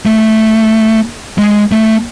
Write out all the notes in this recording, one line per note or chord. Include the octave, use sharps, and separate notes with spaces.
A3
G#3
A3